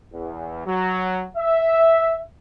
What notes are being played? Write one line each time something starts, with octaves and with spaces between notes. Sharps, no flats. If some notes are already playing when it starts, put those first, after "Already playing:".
E2
F#3
E5